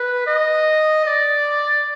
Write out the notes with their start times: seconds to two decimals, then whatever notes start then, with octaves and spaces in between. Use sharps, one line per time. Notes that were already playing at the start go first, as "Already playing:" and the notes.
Already playing: B4
0.27 D#5
1.06 D5